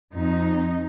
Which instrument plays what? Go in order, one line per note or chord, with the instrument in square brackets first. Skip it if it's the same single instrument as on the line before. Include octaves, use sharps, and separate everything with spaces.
[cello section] F2 D#4